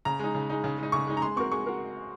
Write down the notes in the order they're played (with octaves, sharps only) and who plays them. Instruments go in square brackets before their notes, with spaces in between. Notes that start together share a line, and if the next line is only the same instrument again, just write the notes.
[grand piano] C#3 [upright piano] A#5
[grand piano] G#3 D#4
C#3
G#3 D#4
C#3
G#3 D#4
[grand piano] C#3 [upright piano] C#6
[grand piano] G#3 D#4
[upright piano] A#5
[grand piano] G#3 [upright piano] C6
[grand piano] C4 F#4 A#4 [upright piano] C#6
[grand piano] G#3 [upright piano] C#6
[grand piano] F#4 A#4